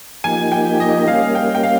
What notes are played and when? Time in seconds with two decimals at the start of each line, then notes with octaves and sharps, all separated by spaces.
0.24 F3 A#3 D#4 G4 G#5
0.52 G5
0.80 D#5
1.07 G3 A#3 C#4 F5
1.35 G5
1.55 G5
1.63 F5